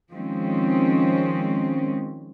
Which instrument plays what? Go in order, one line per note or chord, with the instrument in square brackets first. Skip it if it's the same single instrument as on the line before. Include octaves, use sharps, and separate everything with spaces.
[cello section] D#3 F3 G#3 C4 C#4